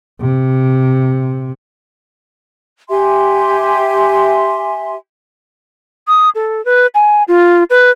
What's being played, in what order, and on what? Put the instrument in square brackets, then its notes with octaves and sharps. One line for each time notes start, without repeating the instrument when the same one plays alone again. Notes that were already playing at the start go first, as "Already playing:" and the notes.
[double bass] C3
[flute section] G4 E5 G#5 C6
[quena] D#6
A4
B4
G#5
F4
B4